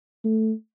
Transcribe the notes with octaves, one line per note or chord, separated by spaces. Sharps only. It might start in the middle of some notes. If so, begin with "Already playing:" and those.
A3